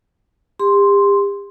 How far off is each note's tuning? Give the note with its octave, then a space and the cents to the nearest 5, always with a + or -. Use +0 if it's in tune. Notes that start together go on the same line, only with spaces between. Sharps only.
G4 +40 C6 +0